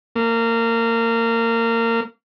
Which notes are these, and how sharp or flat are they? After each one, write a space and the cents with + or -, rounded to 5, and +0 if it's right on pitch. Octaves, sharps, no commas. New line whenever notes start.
A#3 -25